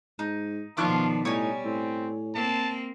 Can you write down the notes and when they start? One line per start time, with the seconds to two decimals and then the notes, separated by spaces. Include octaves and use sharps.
0.19 G#2 D#4
0.77 B2 D#3 F3 D4 F4 C#6 F#6
1.25 A2 G3 D#4 C#5 G#5
1.65 A2 C4
2.35 A#3 C4 A5